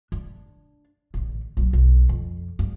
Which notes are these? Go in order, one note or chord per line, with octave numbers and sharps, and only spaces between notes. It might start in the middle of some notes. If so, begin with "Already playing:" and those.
D4
A1 D3
A#1 F#3
B1
F2
G2